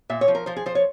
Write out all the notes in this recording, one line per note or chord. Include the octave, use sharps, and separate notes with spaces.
A#2 E5
C#5
F3
A#4
F3 C5
G#4
F3 C5
C#5